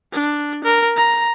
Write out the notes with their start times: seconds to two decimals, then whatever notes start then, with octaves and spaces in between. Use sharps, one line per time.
0.13 D4
0.64 A#4
0.97 A#5